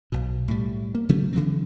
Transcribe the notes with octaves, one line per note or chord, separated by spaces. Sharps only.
B1 B2
A2 G3
A#3
C#3 F#3 A3 C#4
C#3 E3 F#3 C4